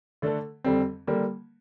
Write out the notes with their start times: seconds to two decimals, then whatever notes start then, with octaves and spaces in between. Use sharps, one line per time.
0.22 D3 A3 D4 A4
0.64 F2 D3 G3 C4
1.07 D3 G3 A#3